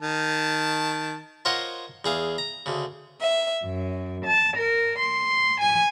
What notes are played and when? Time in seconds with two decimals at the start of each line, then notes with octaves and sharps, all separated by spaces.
0.01 D#3 A5
1.45 F4 A#4 C5 C#5 D#5 F#5
2.05 E2 G#4 F5
2.38 A#5
2.66 D2 C#3
3.21 E5
3.63 F#2
4.24 A5
4.56 A#4
4.98 C6
5.60 G#5